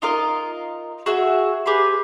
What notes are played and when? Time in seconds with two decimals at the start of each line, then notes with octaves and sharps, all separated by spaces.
0.02 D#4 F4 A#4 D#5
1.06 F#4 G#4 E5
1.66 G4 G#4 B4 C6